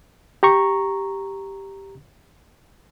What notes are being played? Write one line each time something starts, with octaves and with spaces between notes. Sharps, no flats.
G4 A#5 C#6